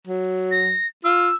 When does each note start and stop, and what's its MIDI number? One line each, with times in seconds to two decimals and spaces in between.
0.08 0.77 54
0.51 0.87 94
1.04 1.31 65
1.04 1.36 88